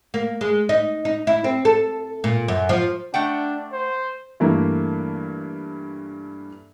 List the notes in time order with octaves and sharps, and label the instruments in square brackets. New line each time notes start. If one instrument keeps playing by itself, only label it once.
[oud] A#3
G#3
D#4
D#4
E4
C4
A4
A#2
F#2
F3
[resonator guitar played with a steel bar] A3 F#5 G5 [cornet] D4
[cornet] C5
[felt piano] G2 E3 A3 A#3